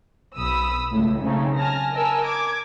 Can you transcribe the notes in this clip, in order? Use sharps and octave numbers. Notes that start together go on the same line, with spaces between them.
B1 B5 D#6 E6
C#2 A2
C#3 F#3 A3 C4 C#4 D#4
G#5 A5 F6 A#6
A#4 D#5 G#5 A5 E6
D6 G#6